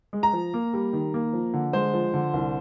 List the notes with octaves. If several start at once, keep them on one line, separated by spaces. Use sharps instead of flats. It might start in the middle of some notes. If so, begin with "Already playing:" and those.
G#3
A#5
F3
A#3
G3
D#3
A#3
F3
D3
G#3 C5
F3
D3
C2